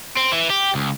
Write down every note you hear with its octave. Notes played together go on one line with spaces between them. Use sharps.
C4
E3
G4
C#2